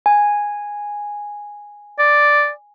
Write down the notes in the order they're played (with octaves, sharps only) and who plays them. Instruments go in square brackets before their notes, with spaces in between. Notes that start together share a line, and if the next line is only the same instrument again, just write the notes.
[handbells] G#5
[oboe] D5